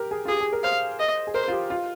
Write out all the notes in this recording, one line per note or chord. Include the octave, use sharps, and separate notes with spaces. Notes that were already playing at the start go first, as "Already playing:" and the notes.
Already playing: G4 A#4
G#4
F4
G4 G#4
G#4
A#4
C5 F5
D#5
G#4
A#4 C5
F4
G4
F4